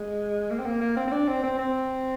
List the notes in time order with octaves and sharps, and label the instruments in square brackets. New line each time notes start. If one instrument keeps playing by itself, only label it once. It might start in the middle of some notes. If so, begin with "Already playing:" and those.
Already playing: [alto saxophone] G#3
A#3
C4
A#3
A#3
C4
C4
D4
C4
C4
C4